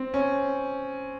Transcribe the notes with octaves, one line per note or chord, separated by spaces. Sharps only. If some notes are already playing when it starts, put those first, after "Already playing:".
Already playing: C4
C#4